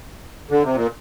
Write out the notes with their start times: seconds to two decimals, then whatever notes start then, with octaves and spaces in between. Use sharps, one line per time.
0.51 D3
0.64 C3
0.75 A#2